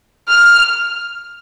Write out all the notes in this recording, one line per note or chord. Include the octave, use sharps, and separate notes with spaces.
F6